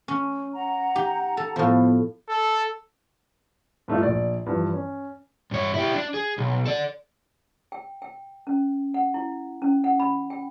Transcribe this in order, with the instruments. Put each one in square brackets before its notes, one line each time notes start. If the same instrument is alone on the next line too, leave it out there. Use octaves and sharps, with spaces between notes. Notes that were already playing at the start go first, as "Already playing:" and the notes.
[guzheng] C#4
[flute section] F#5 A#5
[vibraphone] D#4 [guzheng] G4
[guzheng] A4
[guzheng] A2 F3 [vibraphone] B3 C5
[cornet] A4
[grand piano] G2 A3 D#4 F4
A#1 D5
G2 E3 F3
C#4
[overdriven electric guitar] G2 C#5
E4 G4
D4
G#4
B1
A4 D5
[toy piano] G5
G5
C#4
F#5
E4
C#4
F#5
B5
G5